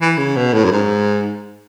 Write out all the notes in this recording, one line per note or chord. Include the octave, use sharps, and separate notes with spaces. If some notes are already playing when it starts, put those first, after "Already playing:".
E3
C#3
B2
A2
F#2
G#2